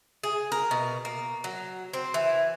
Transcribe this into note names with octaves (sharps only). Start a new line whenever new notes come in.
G#4
A#4
B2
A#3
F#3
C4
E3